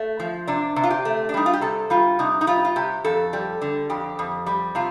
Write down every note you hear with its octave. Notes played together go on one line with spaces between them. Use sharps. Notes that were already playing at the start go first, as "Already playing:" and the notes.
Already playing: A3
F3
C3 D4
C3
F4
G4
A3
D4
G3 D#4
F4
G4
C3 A4
G3 F4
C3 D#4
D#4
G3 F4
F4
C3 G4
F2 A4
G3
D3
F2 G4
F2
G3
C3 F4